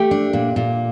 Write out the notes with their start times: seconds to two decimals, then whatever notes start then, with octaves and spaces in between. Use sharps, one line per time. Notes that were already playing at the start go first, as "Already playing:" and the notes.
Already playing: A3 G4
0.11 D4
0.33 A#2
0.56 A#2